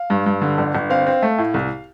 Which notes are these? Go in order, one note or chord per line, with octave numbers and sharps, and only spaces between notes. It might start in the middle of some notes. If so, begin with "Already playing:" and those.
Already playing: F5
G2
G2
D3
G1
G1
C4 F5
C4
A3
A2
C2